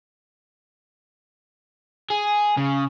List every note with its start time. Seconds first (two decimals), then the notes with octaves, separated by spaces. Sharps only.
2.10 G#4
2.57 C#3